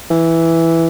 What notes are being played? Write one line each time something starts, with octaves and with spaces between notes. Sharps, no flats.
E3